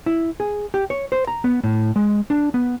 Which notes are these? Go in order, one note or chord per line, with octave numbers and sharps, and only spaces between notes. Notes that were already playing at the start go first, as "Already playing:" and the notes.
E4
G#4
G4
C#5
C5
A#5
B3
A2
G#3
D4
B3